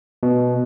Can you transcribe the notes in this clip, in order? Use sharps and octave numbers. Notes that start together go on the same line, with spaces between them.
B2